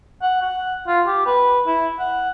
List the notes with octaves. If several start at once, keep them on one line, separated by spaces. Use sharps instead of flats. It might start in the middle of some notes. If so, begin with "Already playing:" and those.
F#5
F#5
F4
G4
B4
E4
F#5